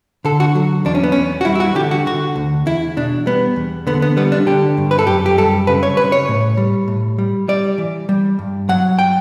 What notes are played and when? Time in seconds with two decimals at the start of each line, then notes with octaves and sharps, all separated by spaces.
0.25 D3 A4
0.40 F#4
0.55 F#3
0.85 E2 D4
0.95 C#4
1.03 B3
1.12 E2 C#4
1.41 F#4
1.45 G3 E4
1.55 E4
1.60 F#4
1.75 D3 G4
1.91 F#4
2.06 D3 F#4
2.36 D2
2.66 E2 E4
2.97 B2 D4
3.26 G3 B3
3.56 E2
3.87 D3 B3
4.02 B3
4.17 G3 B3
4.32 D4
4.46 D3 G4
4.77 G2
4.91 B4
4.99 A4
5.07 F#2 G4
5.26 G4
5.37 G3 A4
5.67 C#3 B4
5.83 C#5
5.97 C#3 B4
6.12 C#5
6.28 A2
6.57 G3
6.88 A2
7.18 G3
7.48 G3 D5
7.78 E3
8.09 G3
8.39 G2
8.69 F#3 F#5
8.99 G5